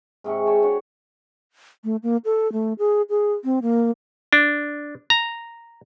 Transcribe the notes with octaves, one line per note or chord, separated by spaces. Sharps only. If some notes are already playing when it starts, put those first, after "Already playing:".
G#2 C3 G#3 C#6
C#5 G5 A5
D4 F#4 C#5
A3
A#3
A4
A3
G#4
G#4
C4
A#3
D4
A#5